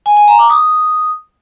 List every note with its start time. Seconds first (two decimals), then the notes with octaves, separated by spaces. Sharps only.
0.06 G#5
0.17 G#5
0.28 A#5
0.39 D6
0.50 D#6